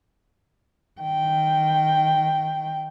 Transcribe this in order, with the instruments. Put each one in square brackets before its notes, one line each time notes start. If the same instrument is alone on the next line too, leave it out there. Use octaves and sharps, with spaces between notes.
[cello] D#3 G5